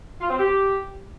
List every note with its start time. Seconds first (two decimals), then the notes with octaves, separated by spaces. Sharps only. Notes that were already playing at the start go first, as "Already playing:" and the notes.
0.21 F4
0.30 C4
0.39 G4